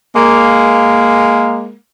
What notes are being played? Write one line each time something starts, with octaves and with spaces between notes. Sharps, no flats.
G#3 A#3